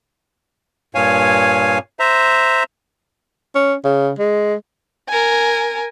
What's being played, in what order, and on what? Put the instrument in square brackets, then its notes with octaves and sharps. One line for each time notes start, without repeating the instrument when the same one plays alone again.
[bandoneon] G2 A#2 C#5 F5 G#5
C5 E5 A#5
[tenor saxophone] C#4
C#3
G#3
[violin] A#4 G#5